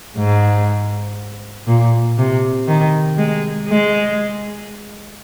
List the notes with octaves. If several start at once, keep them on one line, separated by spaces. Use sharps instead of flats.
G#2
A#2
C3
D#3
G#3
G#3